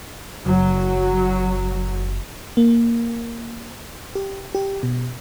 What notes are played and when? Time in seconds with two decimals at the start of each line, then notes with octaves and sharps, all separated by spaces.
0.46 F#1 F#3
2.57 A#3
4.15 G4
4.55 G4
4.83 B2